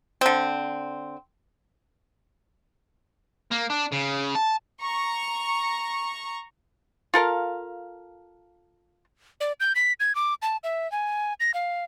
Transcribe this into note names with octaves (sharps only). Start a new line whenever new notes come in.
D3 C4
A#3
D4
C#3
A5
A#5 C#6
F4 A4 A#4 F5
D5
G6
B6
G#6
D6
A5
E5
G#5
A#6
F5